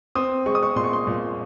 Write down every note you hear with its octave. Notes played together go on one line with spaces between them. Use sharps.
C4 D#6
G#3 C#6
D#6
C#6
A#2 C6
C#6
C6
A#2